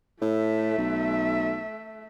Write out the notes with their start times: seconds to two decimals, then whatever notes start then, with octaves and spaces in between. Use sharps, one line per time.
0.22 A2 A3 E5
0.78 B1